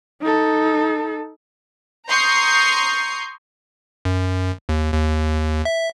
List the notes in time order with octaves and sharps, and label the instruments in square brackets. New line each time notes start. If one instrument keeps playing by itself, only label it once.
[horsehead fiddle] D#4 A4
[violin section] A#5 C6 C#6 D#6 G6 C7
[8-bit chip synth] F#2
D#2
D#2
E5